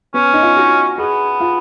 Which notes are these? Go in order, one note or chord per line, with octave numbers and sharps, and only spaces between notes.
B3 C#4
D#4
F4
F#4
B3 G#4
F4